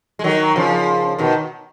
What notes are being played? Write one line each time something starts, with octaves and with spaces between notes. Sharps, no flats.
G#3
D#3 F#3
C#3 F3
B2 D#3